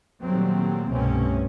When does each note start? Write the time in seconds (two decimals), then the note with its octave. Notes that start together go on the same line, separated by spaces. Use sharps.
0.22 A#2 D#3 F#3 G3 A3 C4
0.91 C2 G2 B2 A3 C4 C#4